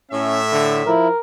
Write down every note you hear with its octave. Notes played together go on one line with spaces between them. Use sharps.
A2 C#4 E5
D3
F3 E4 A#4